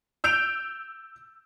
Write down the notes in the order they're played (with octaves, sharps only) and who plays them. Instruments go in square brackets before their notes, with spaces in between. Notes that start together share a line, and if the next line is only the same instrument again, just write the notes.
[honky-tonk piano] E6 G6 D7 F7